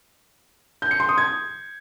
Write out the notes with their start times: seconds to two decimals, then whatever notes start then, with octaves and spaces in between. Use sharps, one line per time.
0.82 G6
0.91 C#7
1.00 C6
1.09 D#6
1.18 G#6